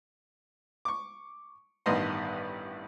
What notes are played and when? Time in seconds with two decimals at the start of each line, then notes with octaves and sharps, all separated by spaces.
0.85 C#6 D6
1.86 A1 G2 D#3 B3 D#5 C6